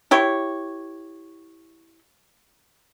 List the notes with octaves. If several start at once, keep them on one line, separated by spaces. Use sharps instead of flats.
E4 G4 C#5